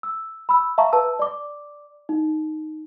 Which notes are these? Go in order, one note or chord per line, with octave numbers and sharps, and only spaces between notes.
E6
B5 E6
E5 F5 A5 A#5 C#6
B4 A5 E6
D5 D6
D#4